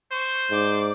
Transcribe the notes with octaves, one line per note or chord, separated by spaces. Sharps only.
C5 C#6
G#2 D5 D6